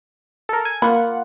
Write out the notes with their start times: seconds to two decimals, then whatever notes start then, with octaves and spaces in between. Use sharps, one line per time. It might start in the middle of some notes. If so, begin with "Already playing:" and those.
0.49 A4 A#4
0.65 G#5
0.82 A#3 F4 F#5 B5